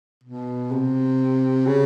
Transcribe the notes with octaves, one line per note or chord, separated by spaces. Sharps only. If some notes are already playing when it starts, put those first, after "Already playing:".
B2
C3
C#3